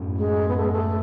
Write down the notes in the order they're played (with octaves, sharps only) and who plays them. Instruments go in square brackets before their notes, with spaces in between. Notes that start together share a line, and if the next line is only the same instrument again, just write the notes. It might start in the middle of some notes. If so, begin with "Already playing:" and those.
Already playing: [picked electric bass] F#2 A2
[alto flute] G#3
B3
A3
G#3
A3